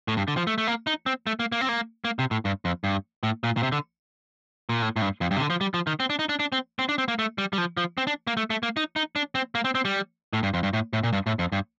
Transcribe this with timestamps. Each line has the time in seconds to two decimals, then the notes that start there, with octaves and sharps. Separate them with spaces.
0.08 A2
0.17 G2
0.28 D3
0.37 F3
0.47 A3
0.58 A3
0.67 A#3
0.87 D#4
1.06 C4
1.27 A3
1.40 A#3
1.52 A#3
1.61 C4
1.69 A#3
2.05 A#3
2.19 C3
2.31 A2
2.45 G2
2.65 F2
2.84 G2
3.23 A2
3.44 A#2
3.57 A#2
3.63 C3
3.72 D3
4.69 A#2
4.82 A2
4.96 A2
5.02 G2
5.21 F2
5.31 G2
5.36 C3
5.40 D3
5.50 F3
5.61 G3
5.74 F3
5.87 D#3
6.00 C4
6.10 D4
6.19 D#4
6.29 D4
6.40 D4
6.52 C4
6.79 C4
6.89 D4
6.98 C4
7.08 A#3
7.19 A3
7.38 G3
7.53 G3
7.58 F3
7.77 F3
7.98 C4
8.07 D4
8.27 A#3
8.37 A3
8.50 A3
8.63 A#3
8.77 D#4
8.96 D#4
9.16 D4
9.35 C4
9.55 A#3
9.65 C4
9.75 C4
9.85 G3
10.33 A2
10.43 G2
10.54 F2
10.63 G2
10.73 A2
10.93 A2
11.04 A#2
11.13 G2
11.27 A2
11.39 F2
11.52 G2